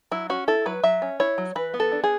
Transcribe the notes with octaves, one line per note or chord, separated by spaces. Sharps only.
F#3 E4
C#4 F#4
E4 A4
F#3 B4
F#3 E5
C#4
E4 C#5
F#3
E3 B4
B3
A4
D4
G#4